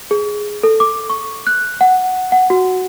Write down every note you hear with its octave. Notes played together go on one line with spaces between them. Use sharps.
G#4
A4
D6
C#6
F#6
F#5
F#5
F#4